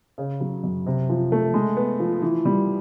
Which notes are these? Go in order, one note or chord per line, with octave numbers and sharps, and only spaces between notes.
C#3
F#3
F#2
C3
F3
A3
G#3
B3
F3
E3
G3